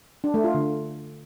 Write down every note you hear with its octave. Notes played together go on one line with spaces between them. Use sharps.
D4
A3
F4
D3